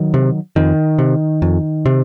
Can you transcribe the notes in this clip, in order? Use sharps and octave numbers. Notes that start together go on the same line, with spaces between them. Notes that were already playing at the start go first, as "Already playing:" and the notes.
Already playing: D#3 F#3
C3
F2 D#3
C3
F2
C3